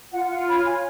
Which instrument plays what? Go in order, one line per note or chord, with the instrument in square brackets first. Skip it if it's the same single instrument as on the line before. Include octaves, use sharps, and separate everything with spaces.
[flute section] F4 F#5
F4 F#5
C#5 B5
F4 G#5